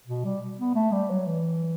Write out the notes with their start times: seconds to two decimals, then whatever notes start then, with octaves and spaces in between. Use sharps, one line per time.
0.07 B2
0.25 G3
0.59 B3
0.75 A3
0.92 G3
1.10 F#3
1.27 E3